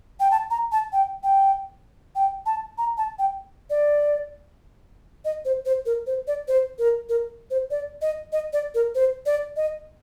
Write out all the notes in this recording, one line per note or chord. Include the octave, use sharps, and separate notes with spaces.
G5
A5
A#5
A5
G5
G5
G5
A5
A#5
A5
G5
D5
D#5
C5
C5
A#4
C5
D5
C5
A#4
A#4
C5
D5
D#5
D#5
D5
A#4
C5
D5
D#5